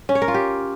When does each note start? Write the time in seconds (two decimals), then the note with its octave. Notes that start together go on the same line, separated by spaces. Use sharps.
0.09 C#4
0.15 C#5
0.22 A#4
0.28 F4
0.34 G4